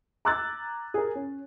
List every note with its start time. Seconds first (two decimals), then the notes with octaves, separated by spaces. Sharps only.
0.25 A#5 D6 E6 F#6 G#6 A6
0.94 G#4 A#4
1.15 C#4